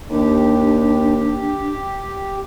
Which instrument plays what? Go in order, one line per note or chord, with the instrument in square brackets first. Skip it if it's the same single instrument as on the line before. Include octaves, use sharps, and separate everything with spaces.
[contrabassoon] D#2 [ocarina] D4 [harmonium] G4